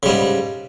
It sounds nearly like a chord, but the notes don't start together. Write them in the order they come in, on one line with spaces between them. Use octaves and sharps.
C#3 G3 G#2